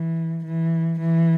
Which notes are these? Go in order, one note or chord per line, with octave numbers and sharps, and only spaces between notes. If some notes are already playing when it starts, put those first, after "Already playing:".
Already playing: E3
E3
E3